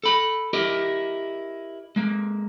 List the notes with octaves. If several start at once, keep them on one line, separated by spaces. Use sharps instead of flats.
A4 B5
E4 G4 A#4 D#5
G#3 A#3